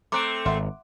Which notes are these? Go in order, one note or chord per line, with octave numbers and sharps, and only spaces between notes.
A3 C4 A#5 C6 D6 F#6 D7
G#1 E5 F#5 C6